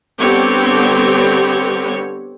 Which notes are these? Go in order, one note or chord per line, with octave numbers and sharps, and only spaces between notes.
D3 G3 B3 C4 G4 C#5